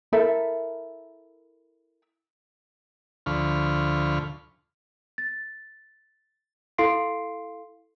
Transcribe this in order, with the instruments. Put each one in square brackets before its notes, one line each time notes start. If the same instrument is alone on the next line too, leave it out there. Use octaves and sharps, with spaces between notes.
[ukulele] E4 A4 A#4 E5
[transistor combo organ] D2 D3 F3 B5 C#6 F6
[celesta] A6
E4 A4 F5 C6 C7 D7